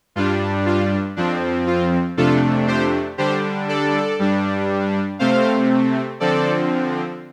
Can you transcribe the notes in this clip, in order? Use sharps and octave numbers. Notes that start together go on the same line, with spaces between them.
G2 G3 D4 F4
F4
F2 F3 C4 D4
F4
F2 C3 A3 D4 F4 A4
G4 C5
D3 G3 D4 G4 C5
A4 D5
G2 G3 D4
C3 A3 C4 C5 F5
D3 F3 C4 A4 D5